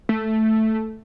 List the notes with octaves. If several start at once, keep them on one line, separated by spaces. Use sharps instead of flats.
A3